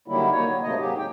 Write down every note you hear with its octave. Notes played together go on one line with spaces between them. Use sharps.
D3 D#3 F#3 G3 A#3 E4
A#3 D#4 C#5
F#3
G#2 C3 A3 A#3 D#5
G#2 F#3 G#3 A#3 G4
C#3 G5